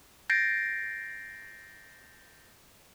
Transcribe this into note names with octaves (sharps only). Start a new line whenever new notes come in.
G6 A6 A#6 C7 D7